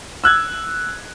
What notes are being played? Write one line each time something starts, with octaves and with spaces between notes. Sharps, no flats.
E6 F#6 G#6